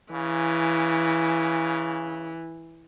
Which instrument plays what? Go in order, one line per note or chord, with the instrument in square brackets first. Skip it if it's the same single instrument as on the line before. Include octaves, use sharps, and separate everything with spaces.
[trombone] C#3 [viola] E3